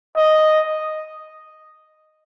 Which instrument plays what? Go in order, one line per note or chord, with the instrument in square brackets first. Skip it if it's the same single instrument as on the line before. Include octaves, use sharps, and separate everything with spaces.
[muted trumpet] D#5